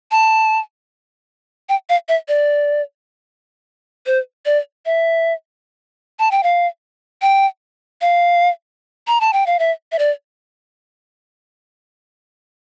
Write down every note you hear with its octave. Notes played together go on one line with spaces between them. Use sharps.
A5
G5
F5
E5
D5
C5
D5
E5
A5
G5
F5
G5
F5
A#5
A5
G5
F5
E5
E5
D5